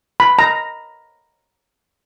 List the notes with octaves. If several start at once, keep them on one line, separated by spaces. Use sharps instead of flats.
B5
A#5